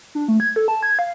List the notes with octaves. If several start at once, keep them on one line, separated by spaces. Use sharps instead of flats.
D4
A3
G#6
A4
A5
G#6
F5